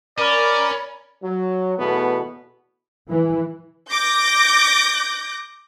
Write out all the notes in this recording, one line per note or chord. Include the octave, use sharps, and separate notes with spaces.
C#4 A#4 D5 B5
F#3
E2 B2 A3 B3
E3
D6 G6 A#6